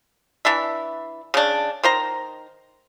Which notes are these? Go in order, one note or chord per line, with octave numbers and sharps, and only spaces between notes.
E3 D4 E5
C#3 D4
D#3 C5 A#5